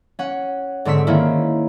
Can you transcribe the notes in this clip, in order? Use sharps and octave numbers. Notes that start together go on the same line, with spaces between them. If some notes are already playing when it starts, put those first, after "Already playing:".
C#4 F#5
G#2 D3 C4 C#6 E6 B6
D#3 A#3 C4 C#4 E4